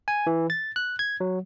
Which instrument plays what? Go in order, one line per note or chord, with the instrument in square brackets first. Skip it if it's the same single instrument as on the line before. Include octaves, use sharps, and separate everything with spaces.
[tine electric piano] G#5
E3
A6
F#6
G#6
F#3